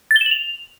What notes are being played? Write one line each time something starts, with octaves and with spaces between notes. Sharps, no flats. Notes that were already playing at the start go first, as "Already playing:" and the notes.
A6
G7
E7
F#7
F7